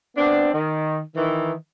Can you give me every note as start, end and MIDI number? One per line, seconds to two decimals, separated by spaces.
0.16 0.53 59
0.16 0.53 60
0.16 0.53 62
0.53 0.99 51
1.16 1.52 51
1.16 1.52 52